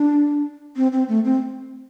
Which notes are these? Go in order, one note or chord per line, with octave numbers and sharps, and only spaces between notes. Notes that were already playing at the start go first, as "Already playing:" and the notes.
Already playing: D4
C4
C4
A3
C4